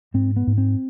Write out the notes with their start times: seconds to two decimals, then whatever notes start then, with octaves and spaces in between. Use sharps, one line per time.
0.14 G#2 C4
0.36 B3
0.47 G#2
0.58 C4